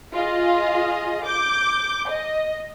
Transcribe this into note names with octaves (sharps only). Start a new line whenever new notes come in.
F4 G#4 D#5
D6 G6
D#5